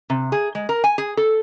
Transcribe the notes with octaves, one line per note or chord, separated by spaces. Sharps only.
C3
G#4
G#3
A#4
G#5
G#4
A4